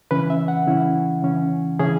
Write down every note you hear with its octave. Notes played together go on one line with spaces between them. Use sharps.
C#3 E3 C#4 B4
E5
F#5
C#3 E3 C#4 E4
C#3 E3 C#4
C#3 E3 C#4 G#4